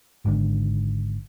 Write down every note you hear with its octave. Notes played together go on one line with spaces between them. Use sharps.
G#1 G#2 D3